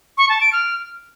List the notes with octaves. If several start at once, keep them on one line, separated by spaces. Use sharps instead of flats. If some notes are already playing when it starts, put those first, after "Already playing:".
C#6
A5
D7
F6